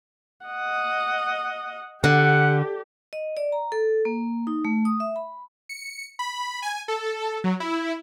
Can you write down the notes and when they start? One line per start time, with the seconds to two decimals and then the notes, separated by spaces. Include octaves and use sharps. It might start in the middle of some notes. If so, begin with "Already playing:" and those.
0.46 D#5 F#5
2.04 D3 G4 F#5
3.13 D#5
3.37 D5
3.52 A#5
3.72 A4
4.05 A#3
4.47 D#4
4.65 A3
4.85 D#6
5.00 E5
5.16 B5
5.69 C#7
6.19 B5
6.62 G#5
6.88 A4
7.44 F#3
7.60 E4